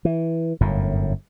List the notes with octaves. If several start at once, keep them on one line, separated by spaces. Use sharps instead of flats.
E3
G1 F#2 A2